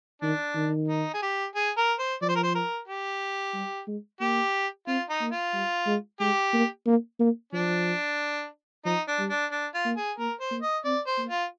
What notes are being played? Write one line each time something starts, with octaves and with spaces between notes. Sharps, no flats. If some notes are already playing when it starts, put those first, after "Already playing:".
D#3 D4
D#3
D#4
G#4
G4
G#4
A#4
C5
F3 D5
C5
A#4
C5
A#4
G4
G3
G#3
A#3 G4
C4 F4
D#4
A#3
F4
G3
G#3
G#3 G4
A#3
A#3
A#3
F3 D4
F3 D#4
D4
G3
D4
D4
F4
A#3
G#4
A#3 A#4
C5
A#3
D#5
C4 D5
C5
A#3
F4